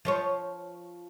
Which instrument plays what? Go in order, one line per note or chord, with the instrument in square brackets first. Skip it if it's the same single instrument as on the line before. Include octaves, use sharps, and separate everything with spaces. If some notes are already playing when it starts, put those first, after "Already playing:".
[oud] F3 C5 C#5